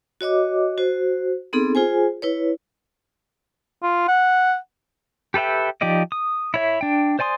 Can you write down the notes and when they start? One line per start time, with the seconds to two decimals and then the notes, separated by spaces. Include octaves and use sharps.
0.21 F#4 C#5 D#5 D6
0.78 F#4 C5
1.53 B3 C4 D#4 G#4 A4
1.75 F4 G#4 C5 G#5
2.22 E4 B4 C#5
3.83 F4
4.08 F#5
5.34 G4 A4 B4 E5 G5
5.81 F3 D#4 G4 D5 D#5
6.12 D#6
6.54 E4 C#5 E5
6.81 D4 G5
7.19 C5 D5 G#5 C6 D#6